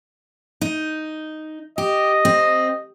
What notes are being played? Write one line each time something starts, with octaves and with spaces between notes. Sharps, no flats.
D#4
G4 D#5
C4